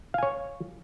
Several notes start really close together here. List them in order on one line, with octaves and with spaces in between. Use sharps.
F5 G#5 C#5